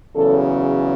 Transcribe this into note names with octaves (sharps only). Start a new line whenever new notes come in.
E2 C#3 F#3 A4